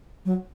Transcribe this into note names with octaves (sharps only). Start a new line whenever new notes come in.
F#3